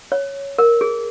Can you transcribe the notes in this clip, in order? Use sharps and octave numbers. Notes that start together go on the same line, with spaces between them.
C#5
A#4
G#4